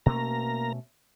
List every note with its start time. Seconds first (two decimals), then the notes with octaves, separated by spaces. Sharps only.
0.06 B2 A3 A#3 C#4 A#5